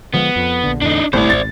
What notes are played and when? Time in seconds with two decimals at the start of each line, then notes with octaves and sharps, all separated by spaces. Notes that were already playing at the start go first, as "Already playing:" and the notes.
0.14 D3 F3 G#3 B3
0.36 F2
0.64 A#1 D3
0.81 E2 A2 D3 D4 D#4
1.13 G1 C2 A2 C5 D5
1.30 G#1 A6